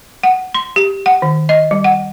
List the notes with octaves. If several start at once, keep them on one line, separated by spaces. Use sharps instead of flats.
F#5
C6
G4
F#5
D#3
D#5
G3
F#5